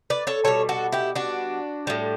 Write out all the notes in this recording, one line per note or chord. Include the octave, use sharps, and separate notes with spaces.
B4 D5
A4 C#5
B2 G3 A4 C#5
F#4 A4
E4 G4
D4 F#4
A2 G3